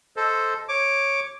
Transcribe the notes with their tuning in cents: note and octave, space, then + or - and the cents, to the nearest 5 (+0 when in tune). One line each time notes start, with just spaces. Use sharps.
A4 +0 C5 +0 D#5 +10
C#5 -10 D6 +0